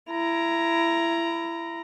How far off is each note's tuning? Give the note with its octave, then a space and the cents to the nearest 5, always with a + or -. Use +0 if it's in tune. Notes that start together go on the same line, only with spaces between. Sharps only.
E4 +25 A#5 +0